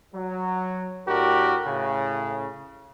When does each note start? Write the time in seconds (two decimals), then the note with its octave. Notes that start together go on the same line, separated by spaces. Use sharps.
0.15 F#3
1.08 A2 D4 F#4 G4 A#4
1.66 A2 C#3